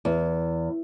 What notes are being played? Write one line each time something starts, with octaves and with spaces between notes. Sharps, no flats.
E2